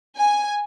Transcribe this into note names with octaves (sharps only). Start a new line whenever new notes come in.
G#5